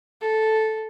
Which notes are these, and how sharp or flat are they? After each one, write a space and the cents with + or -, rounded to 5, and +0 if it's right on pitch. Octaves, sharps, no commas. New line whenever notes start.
A4 -5